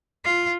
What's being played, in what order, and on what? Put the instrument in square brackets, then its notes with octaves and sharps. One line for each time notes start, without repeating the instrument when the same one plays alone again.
[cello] F4